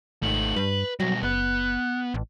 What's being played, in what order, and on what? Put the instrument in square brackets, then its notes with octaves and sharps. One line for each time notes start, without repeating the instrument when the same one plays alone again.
[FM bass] G#1 [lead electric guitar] A3 D#4 [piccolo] F#7
[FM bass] G2 [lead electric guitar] B4
[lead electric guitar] B2 G3 [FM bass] F#3 [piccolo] A#6
[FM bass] F#1 [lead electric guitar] B3 [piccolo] F#6
[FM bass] A1